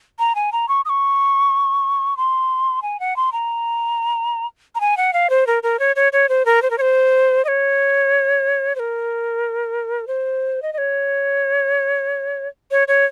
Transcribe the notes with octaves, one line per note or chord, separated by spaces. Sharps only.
A#5
G#5
A#5
C#6
D#6
C#6
C6
G#5
F#5
C6
A#5
A#5
G#5
F#5
F5
C5
A#4
A#4
C#5
C#5
C#5
C5
A#4
C5
A#4
C#5
C5
D#5
C#5
C5
A#4
C5
D#5
D#5
C#5
C#5
C#5